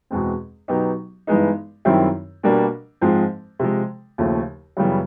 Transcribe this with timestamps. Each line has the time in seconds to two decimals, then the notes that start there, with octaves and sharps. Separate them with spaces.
0.10 E2 B2 G#3 C4
0.68 B2 F#3 B3 D#4 G4
1.27 G2 E3 G#3 B3 D#4
1.85 F#2 D#3 G3 C4 E4
2.43 B2 G3 A#3 D4
3.01 G#2 F3 G#3 C4
3.59 C3 F3 G#3
4.18 D#2 C#3 F3 A3
4.77 F#2 C#3 E3 G3 B3